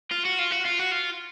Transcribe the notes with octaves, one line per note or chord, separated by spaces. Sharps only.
F4
F#4
F4
F#4
F4
F#4
F4